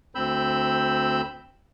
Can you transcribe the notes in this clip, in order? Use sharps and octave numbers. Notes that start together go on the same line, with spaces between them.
D2 C4 B5 E6 G6